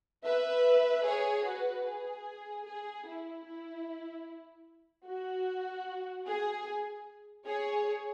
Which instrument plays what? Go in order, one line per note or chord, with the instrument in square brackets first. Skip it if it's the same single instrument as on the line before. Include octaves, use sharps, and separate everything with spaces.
[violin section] B4 E5
G#4 C#5
F#4 B4
G#4
G#4
E4
E4
F#4
G#4
G#4 C#5